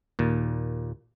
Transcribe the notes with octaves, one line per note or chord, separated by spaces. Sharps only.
D#2 A#2